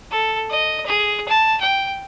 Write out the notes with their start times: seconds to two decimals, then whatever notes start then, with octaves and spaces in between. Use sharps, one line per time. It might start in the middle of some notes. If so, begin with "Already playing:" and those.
0.11 A4
0.50 D#5
0.86 G#4
1.28 A5
1.61 G5